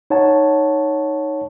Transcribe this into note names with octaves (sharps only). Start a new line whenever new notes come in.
D#4 C#5 F#5 A5